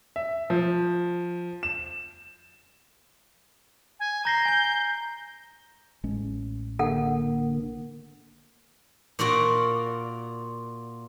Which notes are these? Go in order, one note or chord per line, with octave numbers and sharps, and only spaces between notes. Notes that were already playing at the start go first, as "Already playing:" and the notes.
E5
F3
E7
G#5
A#5 G6 A#6 C7
G#5 G7
A1 G#3 C#4
D3 A#3 A4 F#5
A#2 A#3 F4 F#4 D5